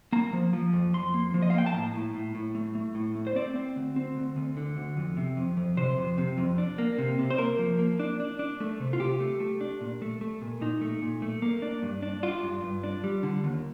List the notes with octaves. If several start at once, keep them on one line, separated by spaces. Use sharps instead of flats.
A#3 A#5
F3
F3
F2
F2 C6
A#3
F3
D#5
F5
A#3 G5
A5
A2 A#5
A2
A2
A2
A3
A3
A2
A3
C5
C4 D5
C4
D2
C4
D2
D2
D3
D2
F2
C3
F2
F2
C3 C5
F2
C3
F2
D4
A#3
C3
C3
C5
A#3 A#4
F3
A#3
D4
D4
D4
A3
C3
F4
C3 G4
A3
A3
D4
A#2
A3
A3
A#2
A#2 D#4
A3
A#2
A3
A#3
D4
G2
D4
D4 F4
G2
G2
D4
G3
D3
D#2